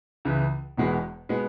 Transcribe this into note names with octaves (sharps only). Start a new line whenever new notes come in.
C#2 C#3 E3
E1 E2 B2 G#3 B3
B2 G#3 B3